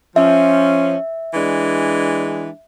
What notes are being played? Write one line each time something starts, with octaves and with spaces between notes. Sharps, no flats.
F3 C#4 E5
E3 G#3 D4